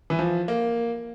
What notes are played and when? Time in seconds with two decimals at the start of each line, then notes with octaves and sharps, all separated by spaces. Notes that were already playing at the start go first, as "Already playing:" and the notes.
0.10 E3
0.19 F3
0.48 A#3